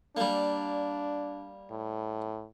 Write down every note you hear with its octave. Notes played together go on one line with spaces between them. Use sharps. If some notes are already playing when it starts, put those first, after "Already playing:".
G3 A#3 D4
A2